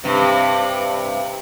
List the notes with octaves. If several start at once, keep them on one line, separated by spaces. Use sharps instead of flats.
G2 C3